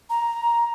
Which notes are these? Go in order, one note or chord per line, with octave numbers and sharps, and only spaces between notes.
A#5